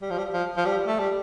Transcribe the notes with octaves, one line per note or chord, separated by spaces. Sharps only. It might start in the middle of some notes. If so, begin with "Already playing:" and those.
G3
F3
G3
F3
F3
G3
A3
G3